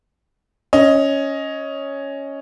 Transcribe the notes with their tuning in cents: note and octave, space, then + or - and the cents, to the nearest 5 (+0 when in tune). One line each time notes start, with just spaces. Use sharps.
C#4 +0 D#5 +10